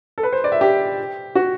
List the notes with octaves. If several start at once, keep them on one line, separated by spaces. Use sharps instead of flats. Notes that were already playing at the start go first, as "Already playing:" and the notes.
A4
B4
C5
D5
E5
G4
F#4